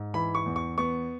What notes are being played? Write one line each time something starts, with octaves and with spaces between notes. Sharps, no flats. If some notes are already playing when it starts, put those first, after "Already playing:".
Already playing: G#2
E3 B5
C#6
E2
C#6
B3 C#6